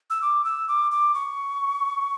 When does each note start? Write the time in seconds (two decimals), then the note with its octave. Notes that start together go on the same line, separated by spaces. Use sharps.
0.10 E6
0.22 D6
0.45 E6
0.68 D6
0.91 D6
1.14 C#6